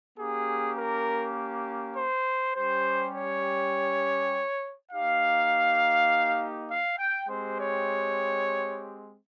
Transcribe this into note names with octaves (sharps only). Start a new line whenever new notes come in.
A#3 C#4 G4 G#4
A#4
C5
G3 C#4 G4 C5
C#5
A#3 D#4 G4 F5
F5
G5
G#3 C4 G4 C5
C#5